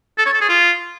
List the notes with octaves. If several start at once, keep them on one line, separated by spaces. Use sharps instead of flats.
A4
C#5
A4
G#4
F4